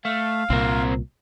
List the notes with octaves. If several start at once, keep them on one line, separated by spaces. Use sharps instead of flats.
A3 F5
C2 A#2 C4 A#4